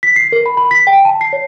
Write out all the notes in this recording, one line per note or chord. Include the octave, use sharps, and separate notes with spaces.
B6
C7
A#4
B5
B5
B6
G5
A5
C7
C#5